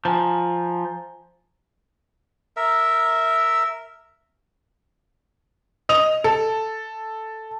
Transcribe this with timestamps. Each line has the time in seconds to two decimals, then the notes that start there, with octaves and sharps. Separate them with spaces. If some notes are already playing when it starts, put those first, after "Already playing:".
0.05 F3 G#5 A#5
2.57 A#4 E5
5.89 D#5 D#6 F7
6.24 A4